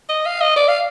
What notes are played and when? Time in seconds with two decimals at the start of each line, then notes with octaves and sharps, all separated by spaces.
0.09 D#5
0.25 F5
0.41 D#5
0.56 D5
0.68 F5